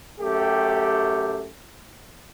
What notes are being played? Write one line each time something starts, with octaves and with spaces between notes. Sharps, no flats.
F#2 A3 G4